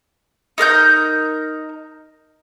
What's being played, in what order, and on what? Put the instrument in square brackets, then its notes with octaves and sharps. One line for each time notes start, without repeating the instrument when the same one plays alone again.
[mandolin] D#4 A#4 F6 G6